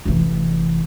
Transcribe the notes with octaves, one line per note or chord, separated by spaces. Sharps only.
F1 E3